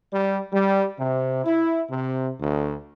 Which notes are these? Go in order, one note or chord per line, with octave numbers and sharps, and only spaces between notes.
G3
G3
C3
E4
C3
D2